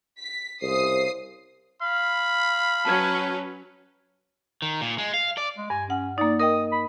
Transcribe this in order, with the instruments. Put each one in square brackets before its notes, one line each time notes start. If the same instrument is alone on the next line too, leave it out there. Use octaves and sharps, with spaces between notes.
[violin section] B6
[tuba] C2 [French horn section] C#3 C5 [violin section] D#6 C7
[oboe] F5 [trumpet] B5
[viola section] F#3 C#4 B4 [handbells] A5 F6 G#6
[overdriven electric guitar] D#3
A#2
G#3
F5
D5
[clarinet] G#3
[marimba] G2 [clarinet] G#5
[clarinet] C#4 [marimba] F#5
[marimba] A#3 D#4 [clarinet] D5
[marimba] A#4 D#5 G5 [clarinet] D#6
[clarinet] B5